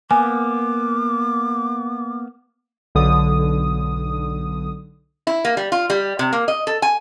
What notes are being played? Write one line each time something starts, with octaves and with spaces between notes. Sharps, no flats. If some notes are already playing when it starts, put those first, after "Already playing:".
A#3 B3 G#5 D6
B1 D3 D#6
E4
A#3
G3
F4
G3
C3
A#3
D#5
A4
G#5